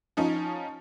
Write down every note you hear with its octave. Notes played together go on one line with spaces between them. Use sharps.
F3 C#4 D#4